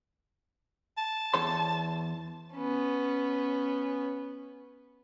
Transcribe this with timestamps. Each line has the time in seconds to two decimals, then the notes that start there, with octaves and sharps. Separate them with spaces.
0.98 A5
1.34 E2 C#5 C6
2.54 B3 C#4